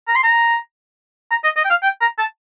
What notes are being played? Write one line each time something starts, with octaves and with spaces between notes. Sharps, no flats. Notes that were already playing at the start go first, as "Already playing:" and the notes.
A#5
C6
A#5
A#5
D#5
D#5
G5
F5
G5
A#5
A5